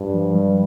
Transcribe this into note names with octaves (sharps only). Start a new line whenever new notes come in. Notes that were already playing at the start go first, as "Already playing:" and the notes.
Already playing: G2
F3
G3